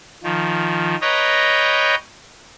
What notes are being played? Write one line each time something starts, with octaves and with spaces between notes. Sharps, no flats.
D#3 F3
B4 C#5 D#5 G5 A#5